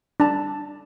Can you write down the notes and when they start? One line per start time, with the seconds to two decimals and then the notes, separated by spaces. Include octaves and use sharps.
0.20 D4 A5